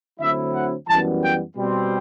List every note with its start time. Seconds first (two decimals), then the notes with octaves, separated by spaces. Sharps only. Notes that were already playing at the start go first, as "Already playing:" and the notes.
0.20 D2 D3 F#3 C4 E4 E5
0.54 F#5
0.88 F#2 E3 G3 B3 A5
1.22 G5
1.56 B2 G3 C4